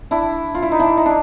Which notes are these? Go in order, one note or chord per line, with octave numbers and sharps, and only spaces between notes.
D4 E4
F4
E4
D#4
D4 E4
D#4
D4